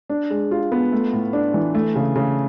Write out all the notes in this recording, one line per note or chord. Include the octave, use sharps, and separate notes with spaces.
D4
G#3
F4
B3
A3
A2
D4
E3
A3
C#3
C#3